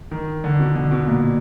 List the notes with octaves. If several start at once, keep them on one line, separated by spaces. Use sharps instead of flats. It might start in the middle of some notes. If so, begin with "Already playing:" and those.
D#3
D3
B2
D3
B2
A#2